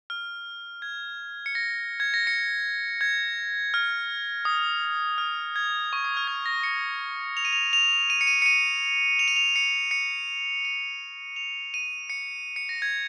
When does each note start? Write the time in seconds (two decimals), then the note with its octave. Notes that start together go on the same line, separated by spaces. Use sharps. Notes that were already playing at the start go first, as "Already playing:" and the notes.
0.10 F6
0.82 G#6
1.46 C#7
1.55 A#6
2.00 G#6
2.14 A#6
2.27 C#7
3.01 G#6
3.74 F6
4.45 D#6
5.18 F6
5.56 G#6
5.93 C#6
6.05 D#6
6.17 F6
6.27 G#6
6.46 A#6
6.64 C#7
7.37 F7
7.45 D#7
7.53 F7
7.73 F7
8.10 D#7
8.21 C#7
8.27 D#7
8.42 C#7
8.46 D#7
9.19 F7
9.28 D#7
9.36 F7
9.56 C#7
9.91 C#7
10.65 D#7
11.36 F7
11.74 D#7
12.10 C#7
12.56 C#7
12.69 A#6
12.82 G#6